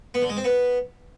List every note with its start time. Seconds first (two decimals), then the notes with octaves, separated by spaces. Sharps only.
0.14 B3
0.22 D3
0.29 G#3
0.37 C4
0.44 B3